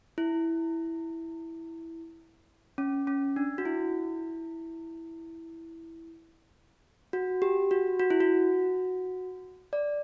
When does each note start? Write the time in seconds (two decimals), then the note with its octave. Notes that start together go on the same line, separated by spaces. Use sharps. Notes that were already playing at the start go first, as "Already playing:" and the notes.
0.18 E4
2.78 C#4
3.07 C#4
3.36 D4
3.58 F#4
3.65 E4
7.13 F#4
7.42 G4
7.71 F#4
7.99 F#4
8.10 E4
8.21 F#4
9.73 D5